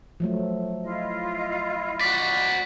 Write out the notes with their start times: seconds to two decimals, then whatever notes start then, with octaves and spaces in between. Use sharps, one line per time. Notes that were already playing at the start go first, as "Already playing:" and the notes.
0.20 F3 F#3 A3
0.83 E4 F4 D#5
2.00 F#4 D5 B6